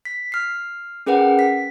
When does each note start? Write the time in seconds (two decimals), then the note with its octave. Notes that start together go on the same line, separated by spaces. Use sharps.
0.05 B6
0.32 F6 C7
1.06 C#4 G#4 A#4 B4 F#5 G5
1.39 B6